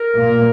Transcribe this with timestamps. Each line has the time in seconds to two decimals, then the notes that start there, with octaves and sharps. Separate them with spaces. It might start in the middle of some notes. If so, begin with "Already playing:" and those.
Already playing: A#4
0.16 A#2 A#3